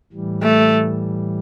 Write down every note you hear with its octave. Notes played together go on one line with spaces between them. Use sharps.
A2 E3 G3
A3